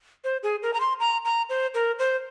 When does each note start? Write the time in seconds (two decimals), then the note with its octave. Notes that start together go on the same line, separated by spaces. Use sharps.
0.24 C5
0.43 G#4
0.63 A#4
0.74 A#5
0.80 C6
1.00 A#5
1.25 A#5
1.49 C5
1.74 A#4
1.99 C5